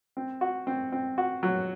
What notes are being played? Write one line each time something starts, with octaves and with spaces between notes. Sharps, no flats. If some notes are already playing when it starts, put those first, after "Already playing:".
C4
F#4
C4
C4
F#4
F#3